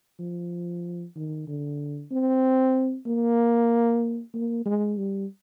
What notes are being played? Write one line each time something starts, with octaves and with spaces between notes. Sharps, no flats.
F3
D#3
D3
C4
A#3
A#3
G#3
G3